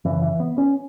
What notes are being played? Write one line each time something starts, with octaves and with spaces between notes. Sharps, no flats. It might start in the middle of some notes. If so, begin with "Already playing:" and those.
F#2 C#3 E3
E3
B3
C#4